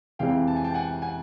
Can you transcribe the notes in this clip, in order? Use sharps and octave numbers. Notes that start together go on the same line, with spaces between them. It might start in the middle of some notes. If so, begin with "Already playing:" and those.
F2 C3 E3 G#3 F5 G5
A5
G#5
G5 A5
F#5 G#5
F#5 G#5